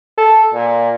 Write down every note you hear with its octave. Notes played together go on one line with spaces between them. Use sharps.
A4
A#2